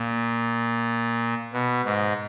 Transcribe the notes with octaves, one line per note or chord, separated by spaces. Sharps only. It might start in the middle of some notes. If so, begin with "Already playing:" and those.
Already playing: A#2
B2
G#2